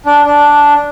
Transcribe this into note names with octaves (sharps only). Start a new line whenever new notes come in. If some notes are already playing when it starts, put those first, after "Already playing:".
D4
D4